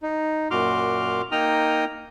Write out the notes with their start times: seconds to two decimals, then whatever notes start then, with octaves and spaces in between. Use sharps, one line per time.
0.02 D#4
0.51 F#2 A#2 F#4 C6 D6 F6
1.31 A#3 D#4 G5 A#5 D#6 F6